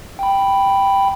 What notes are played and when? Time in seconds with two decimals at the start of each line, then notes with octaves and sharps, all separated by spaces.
0.19 G5 B5